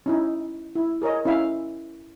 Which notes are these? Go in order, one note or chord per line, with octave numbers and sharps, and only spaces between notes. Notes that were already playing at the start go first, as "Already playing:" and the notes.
C#4 D#4 E4
E4
G#4 A#4 C#5 D#5
C#4 E4 E5 F5